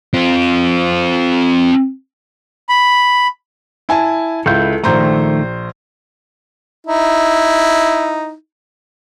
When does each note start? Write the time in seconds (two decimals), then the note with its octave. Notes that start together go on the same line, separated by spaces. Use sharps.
0.13 C4 F4
2.69 B5
3.89 E4 G#5 A5
4.46 C#2 E4 A4 G6
4.84 A#1 D#3 A3 C5 A#5
6.87 D#4 E4